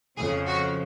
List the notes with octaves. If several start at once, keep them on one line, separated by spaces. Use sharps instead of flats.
F2 C#3 F3 G#4
F#4